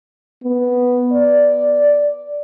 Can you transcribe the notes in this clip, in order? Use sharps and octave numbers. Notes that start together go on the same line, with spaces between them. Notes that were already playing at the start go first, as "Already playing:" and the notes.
B3
D5